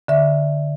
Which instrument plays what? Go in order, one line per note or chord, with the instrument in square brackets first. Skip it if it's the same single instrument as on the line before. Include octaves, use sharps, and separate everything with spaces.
[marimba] D3 E5